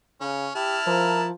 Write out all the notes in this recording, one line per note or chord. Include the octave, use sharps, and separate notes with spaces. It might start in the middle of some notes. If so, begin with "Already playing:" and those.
C#3 C#4
E4 G4 A5 F6
F3 A#4